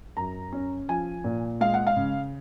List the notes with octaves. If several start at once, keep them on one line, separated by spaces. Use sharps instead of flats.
F#2 A#5
C#4
F3 G#5
A#2
G#3 F5
F#5
F5
C#3